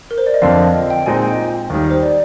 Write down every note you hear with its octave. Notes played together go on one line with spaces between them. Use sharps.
A#4
C5
D5
D#5
F2 D3 F3 C4 F5
D#5
D#5
G5
A#2 G#3 C4 D#4 G#5
G5
D#2 D#3 G3
C5
D5